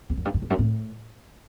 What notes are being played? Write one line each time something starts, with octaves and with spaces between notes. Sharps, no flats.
E2
F#2
G2
F#2
E2
F#2
A2